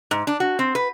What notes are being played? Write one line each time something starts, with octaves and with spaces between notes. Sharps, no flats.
G#2
D4
F#4
C4
B4